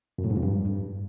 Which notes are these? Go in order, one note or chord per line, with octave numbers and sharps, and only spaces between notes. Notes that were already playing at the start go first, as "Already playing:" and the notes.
F#2
A2
G#2
F2
G2